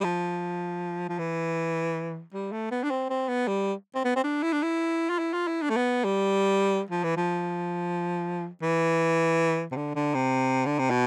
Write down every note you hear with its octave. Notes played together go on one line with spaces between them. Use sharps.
G3
F3
F3
E3
G3
A3
B3
D4
C4
C4
B3
G3
C4
B3
C4
D4
E4
D4
E4
F4
E4
F4
E4
D4
A3
B3
G3
F3
E3
F3
E3
C3
D3
D3
C3
D3
C3
B2